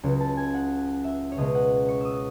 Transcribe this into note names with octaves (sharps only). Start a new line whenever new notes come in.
C#2 C#3 F#3
A5
G#5
F#5
E5
C#5
C#2 B2 G#3 C#4 D#5
F#5
C#6
D#6 E6